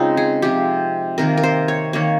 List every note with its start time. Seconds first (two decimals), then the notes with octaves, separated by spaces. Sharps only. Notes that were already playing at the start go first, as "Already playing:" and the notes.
Already playing: C#3 G#3 C4 D#4 F4
0.17 G#4
0.42 C3 F3 G#3 G4
1.18 C3 D#3 A#3 A#4
1.38 A#4
1.43 C5
1.68 C#5
1.93 D#3 A#3 C#5